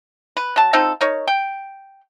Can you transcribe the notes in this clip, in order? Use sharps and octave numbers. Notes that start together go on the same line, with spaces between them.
B4
F#3 A5
C4 D#4 F4 A4
D#4 A#4 C#5
G5